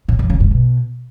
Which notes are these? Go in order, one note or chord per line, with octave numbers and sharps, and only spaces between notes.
A2
F2
C#3
G2
B2